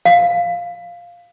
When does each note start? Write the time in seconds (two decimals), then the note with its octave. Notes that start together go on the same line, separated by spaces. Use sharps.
0.05 F5